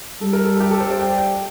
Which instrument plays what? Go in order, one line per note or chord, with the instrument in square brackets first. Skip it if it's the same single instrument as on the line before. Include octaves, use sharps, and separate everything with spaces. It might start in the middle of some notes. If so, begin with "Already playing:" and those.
[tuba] G3 [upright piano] A4
[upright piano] A#4
A4
A4
G4
A4
C5
D5
G5
G5